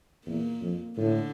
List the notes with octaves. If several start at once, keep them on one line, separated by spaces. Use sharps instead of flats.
E2 A#2 A#3
F2
A2 D3